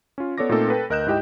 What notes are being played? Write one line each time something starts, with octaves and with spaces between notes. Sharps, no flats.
C#4 F4
B3 A4 C#5 D5 D6 A#6
A#2 A3 C4 D#4 A4 A#4
A4 B4 G5
D2 A#4 D#5 F#6 G6 E7
G#2 E4 G4 D#5 G5